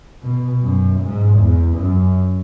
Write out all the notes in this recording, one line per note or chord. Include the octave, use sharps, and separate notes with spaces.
B2
F#2
G#2
E2
F#2